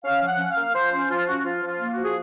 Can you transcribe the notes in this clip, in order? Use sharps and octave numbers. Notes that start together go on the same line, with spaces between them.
C#4 F5
F3
F#5
C#4
F5
A#3
F3 C5
C#4 C5
F3 F4
C#4 F#4
F3 F4
F3
F4
A#3
F#4
F3
G#4